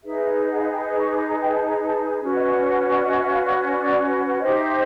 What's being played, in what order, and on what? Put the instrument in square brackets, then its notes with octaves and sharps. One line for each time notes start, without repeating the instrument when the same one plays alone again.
[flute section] D#4 G#4 B4 E5
F#5
F5
G5
C#6
D6
A#5
G5
A5
A#5
A5
G#5
C#4 F#4 B4
D#5
D5
C#5
C#5
D5
D#5
E5
F5
D5
C#5
D5
D#4 G4 C5 D#5
E5